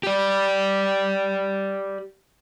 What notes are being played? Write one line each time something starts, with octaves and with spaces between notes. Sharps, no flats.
G4 D5